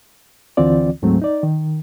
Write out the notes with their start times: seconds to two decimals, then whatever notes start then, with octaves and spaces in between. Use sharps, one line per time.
0.57 D2 D3 E3 C4 F4 D5
1.02 D2 G#2 F#3 A3 C4
1.22 D#4 D5
1.43 D#3